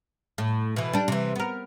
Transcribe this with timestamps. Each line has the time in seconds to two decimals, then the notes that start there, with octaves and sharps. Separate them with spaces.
0.38 A2
0.76 B2 E3
0.93 G3 D4
1.08 C3 E3
1.36 B3 A#4